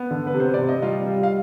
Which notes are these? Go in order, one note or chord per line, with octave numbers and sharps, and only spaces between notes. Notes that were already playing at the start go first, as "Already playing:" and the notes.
Already playing: B3
D3
B4
C3
C5
C3 D5
D#5
G3 F4 F5
G3
F5